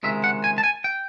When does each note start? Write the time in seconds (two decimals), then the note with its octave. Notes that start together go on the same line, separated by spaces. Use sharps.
0.03 C#2 C3 D#3 G#3 E5
0.24 F#5
0.44 G#5
0.58 A5
0.64 G#5
0.84 G5